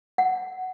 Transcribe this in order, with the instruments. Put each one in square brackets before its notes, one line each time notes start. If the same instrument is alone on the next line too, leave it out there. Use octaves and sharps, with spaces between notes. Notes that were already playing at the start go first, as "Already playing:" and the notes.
[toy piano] F#5